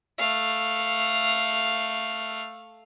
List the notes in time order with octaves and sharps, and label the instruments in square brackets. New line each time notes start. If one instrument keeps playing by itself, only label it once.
[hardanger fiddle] A3 F5